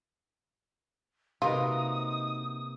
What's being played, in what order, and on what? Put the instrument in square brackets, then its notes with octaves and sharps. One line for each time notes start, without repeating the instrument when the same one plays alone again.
[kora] C3 A#3 B4 [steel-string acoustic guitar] D#4 F#4 [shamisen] F4 [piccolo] D#6